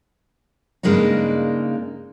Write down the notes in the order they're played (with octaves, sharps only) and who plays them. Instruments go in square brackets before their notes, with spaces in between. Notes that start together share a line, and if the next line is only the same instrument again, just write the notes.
[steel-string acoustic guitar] G2 C#3 G#3 A#3 D4 D#4